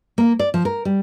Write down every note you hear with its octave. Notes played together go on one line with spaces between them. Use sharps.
A#3
D5
F3
A#4
G3